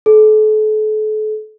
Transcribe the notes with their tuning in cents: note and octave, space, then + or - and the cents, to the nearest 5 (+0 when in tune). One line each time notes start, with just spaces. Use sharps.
A4 -40